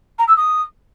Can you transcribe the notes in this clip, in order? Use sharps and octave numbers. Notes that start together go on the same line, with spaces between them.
A#5
E6
D#6